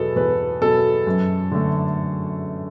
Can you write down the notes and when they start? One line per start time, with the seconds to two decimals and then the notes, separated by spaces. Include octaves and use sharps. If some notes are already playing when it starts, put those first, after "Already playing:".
Already playing: E2 B2 F#3 B3 A4
0.16 E2 B4
0.61 B2 F#3 B3 A4
1.07 F#2
1.51 D3 A3